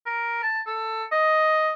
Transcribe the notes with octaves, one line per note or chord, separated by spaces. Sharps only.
A#4
A5
A4
D#5